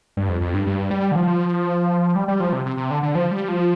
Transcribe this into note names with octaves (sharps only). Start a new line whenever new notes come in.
G2
F2
F2
G2
G2
G3
D3
F3
G3
G3
F3
C3
C3
C3
D3
D3
F3
G3
F3